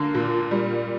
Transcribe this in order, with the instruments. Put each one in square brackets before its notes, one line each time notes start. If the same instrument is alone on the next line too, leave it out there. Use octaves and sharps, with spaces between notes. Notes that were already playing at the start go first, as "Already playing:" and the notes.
Already playing: [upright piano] D3 [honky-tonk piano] A#3
[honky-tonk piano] A#2
G3